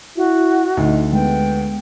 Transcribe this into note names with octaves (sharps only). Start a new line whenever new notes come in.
E4 F#4
D2 D#4
G#3 B3 G5